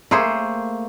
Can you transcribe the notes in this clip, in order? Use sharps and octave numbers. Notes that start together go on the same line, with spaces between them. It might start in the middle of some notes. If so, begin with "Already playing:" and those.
A3 A#3 G#4 C5